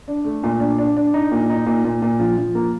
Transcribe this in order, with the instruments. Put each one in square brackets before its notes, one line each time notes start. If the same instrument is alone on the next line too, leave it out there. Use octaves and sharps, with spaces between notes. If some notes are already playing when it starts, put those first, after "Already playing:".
[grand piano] D4
A3
A#2
D4
D4
D4
D#4
A#2
D#4
A#2
A#2
A#2
F3
F3
A#3